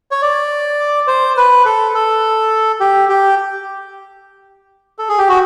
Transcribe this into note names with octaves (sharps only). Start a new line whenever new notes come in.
C#5
D5
C5
B4
A4
A4
G4
G4
A4
G#4
G4
F#4